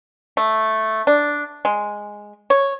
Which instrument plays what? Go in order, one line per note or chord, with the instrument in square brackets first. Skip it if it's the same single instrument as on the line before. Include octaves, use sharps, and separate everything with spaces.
[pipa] A3
D4
G#3
C#5